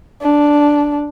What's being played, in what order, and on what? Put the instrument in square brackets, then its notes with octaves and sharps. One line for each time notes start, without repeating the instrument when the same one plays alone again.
[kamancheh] D4